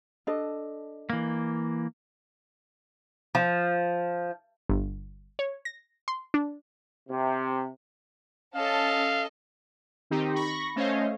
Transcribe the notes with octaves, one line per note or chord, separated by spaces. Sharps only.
D4 A4 D#5
E3 A#3
F3
G1
C#5
A#6
C6
D4
C3
C#4 A4 D#5 F5 A5
D#3 C4 D#4 G4
B5 C#6 A#6
A3 C#4 C5 C#5 D#5 F5